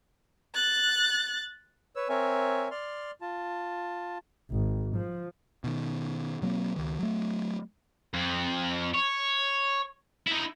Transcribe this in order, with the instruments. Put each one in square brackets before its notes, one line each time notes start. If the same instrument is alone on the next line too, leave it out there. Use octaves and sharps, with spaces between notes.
[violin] F#6 A6
[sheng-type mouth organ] B4 C#5 E6
C4 A#4 C#5 E5 G#5
D5 C6 F6
F4 A5
[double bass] G#1
F3
[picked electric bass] B2 D#3
B2 F#3 A#3 C4
C#2 D#3
F#3 A3
[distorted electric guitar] F2
C#5
D#4 E4